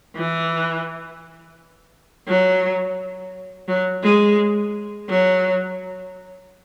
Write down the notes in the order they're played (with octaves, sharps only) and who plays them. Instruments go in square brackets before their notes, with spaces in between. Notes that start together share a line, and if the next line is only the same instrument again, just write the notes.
[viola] E3
F#3
F#3
G#3
F#3